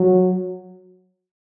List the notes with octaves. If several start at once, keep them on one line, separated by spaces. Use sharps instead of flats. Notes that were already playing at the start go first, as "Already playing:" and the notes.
Already playing: F#3